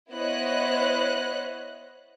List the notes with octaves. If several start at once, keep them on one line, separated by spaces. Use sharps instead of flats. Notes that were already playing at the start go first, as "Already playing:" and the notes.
B3 E4 C5 C#5 D#5 F#6